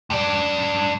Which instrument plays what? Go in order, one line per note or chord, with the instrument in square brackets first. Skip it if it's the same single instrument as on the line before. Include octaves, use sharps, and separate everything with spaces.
[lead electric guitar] G2 D5